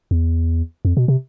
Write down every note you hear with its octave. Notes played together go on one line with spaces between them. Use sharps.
E2
F2
B2
C3